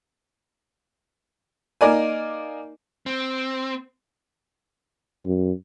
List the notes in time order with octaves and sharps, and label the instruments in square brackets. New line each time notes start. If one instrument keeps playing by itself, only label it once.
[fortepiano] A#3 D#4 A#4 D5 G#5
[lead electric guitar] C4
[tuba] F#2